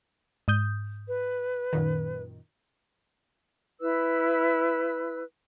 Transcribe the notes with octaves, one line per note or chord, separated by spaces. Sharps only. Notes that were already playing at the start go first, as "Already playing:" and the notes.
G#2 D#6 G6
B4
F#2 A#2 D#3
E4 B4 E6